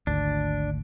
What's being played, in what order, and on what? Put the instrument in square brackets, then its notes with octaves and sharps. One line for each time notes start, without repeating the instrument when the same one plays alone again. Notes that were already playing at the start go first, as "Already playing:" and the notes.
[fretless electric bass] G#1 D2 [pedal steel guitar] D4